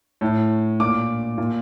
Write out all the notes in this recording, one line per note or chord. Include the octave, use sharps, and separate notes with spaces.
A2
A#2 D6
A#2